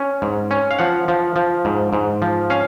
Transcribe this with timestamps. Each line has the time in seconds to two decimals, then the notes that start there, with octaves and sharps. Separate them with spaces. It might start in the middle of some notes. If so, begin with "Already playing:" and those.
Already playing: C#4
0.22 G#2
0.51 C#4
0.71 F5
0.79 F3 F#5
1.08 F3
1.36 F3
1.65 G#2
1.93 G#2
2.22 F3
2.50 C#4 F5